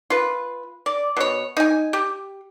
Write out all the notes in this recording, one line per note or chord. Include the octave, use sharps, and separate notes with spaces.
F4 B4
D5
B2 C#5
D#4 G#5
G4